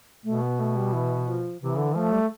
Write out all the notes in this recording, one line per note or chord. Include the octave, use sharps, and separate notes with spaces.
B2 A3
B3
A3
G3
E3
F3
C3 E3
D3
F3 A3
G3